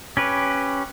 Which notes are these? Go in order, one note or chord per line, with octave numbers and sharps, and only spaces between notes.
C#4 G4 B4